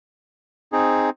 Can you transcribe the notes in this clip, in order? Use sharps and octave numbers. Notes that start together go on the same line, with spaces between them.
C4 D#4 G#4